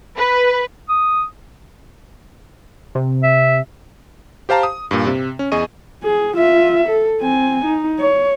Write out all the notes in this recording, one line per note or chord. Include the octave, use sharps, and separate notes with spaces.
B4
D#6
C3
E5
G4 C5 F5 A5 A#5
D#6
G2 A#2
C3
C#4
E2 G#4 D#5 C#6 D#7
G#4
F4 E5
A4
C4 G#5
D#4
C#5